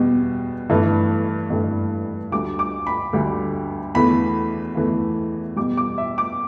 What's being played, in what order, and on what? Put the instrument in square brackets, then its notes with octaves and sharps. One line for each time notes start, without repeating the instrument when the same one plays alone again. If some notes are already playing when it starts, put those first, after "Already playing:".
Already playing: [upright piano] E2 B2 G3
G2 E3 A3
G2 E3 A3
D2 D3 G3 D6
D6
B5
D2 D3 G3
E2 E3 A3 B5
E2 E3 A3
E2 B2 G3 D6
D6
E5
D6